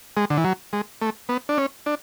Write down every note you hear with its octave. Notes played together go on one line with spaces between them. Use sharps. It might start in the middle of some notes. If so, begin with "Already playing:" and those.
G#3
D3
E3
F#3
G#3
A3
B3
D4
C#4
D4